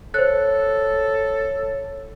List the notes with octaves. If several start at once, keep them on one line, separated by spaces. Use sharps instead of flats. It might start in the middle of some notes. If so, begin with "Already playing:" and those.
A4 C5 C#5 F#6